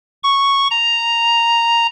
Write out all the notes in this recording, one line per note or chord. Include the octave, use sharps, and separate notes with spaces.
C#6
A#5